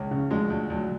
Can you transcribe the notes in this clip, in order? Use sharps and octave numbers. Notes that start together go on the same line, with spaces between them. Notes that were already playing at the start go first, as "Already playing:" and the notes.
Already playing: C#2 C#3
C#3
D2 F3 G#3
D2
D2 F#3